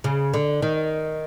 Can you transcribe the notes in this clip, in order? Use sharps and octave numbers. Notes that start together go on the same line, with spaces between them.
C#3
D3
D#3